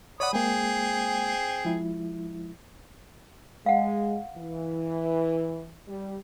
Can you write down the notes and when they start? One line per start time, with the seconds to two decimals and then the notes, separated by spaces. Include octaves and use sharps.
0.20 C#5 D5 F#5 B5 D#6
0.33 G#3 A#3 C4 G#4
1.65 F3 G#3 E4
3.66 G#3 F5 F#5
4.36 E3
5.88 G3